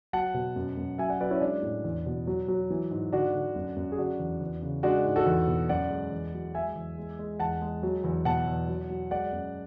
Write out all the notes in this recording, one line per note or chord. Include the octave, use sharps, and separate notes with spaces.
F#3 F#5 A5
B2
F#2
F#2
F#3 E5 G#5
D5 F#5
F#3 B4 D5
C#4 E4
G#3 D4
A2
E2
B2
F#3
F#3
E3
G#2
D3 D4 F#4
D3
F#2
F#2
G#4
D3 D4 F#4
E2
E2
C#3
G#3 D4 F#4
G#2
F#4 A4
E2
B2
F#2 D5 F#5
G#3
E2
F#3
G#3 E5 G#5
E2
G#3
G#3
E2 F#5 A5
G#3
F#3
E2
B2 F#5 A5
E2
F#3
F#3
G#3 D5 F#5
F#2